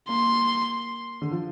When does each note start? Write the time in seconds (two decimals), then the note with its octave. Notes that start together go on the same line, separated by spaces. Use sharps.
0.09 A#3 C6
1.22 D3
1.31 F3